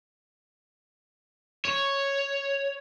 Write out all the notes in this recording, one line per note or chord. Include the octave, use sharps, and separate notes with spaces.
C#5